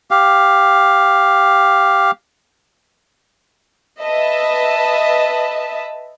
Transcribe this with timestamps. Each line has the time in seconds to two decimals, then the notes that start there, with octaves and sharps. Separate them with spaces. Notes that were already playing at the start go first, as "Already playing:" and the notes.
0.11 G4 F5
4.02 B4 D#5 E5 A5